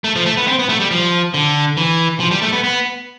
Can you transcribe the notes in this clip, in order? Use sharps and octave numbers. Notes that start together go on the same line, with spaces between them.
A3
F3
A3
B3
C4
B3
A3
G3
F3
D3
E3
F3
G3
A3
B3
B3